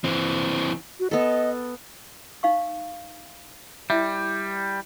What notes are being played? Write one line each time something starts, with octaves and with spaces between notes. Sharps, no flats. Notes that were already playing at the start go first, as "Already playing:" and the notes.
E3 C4
F#4
B3 A4 D#5
D#4 F5 C#6
G3 E4 E5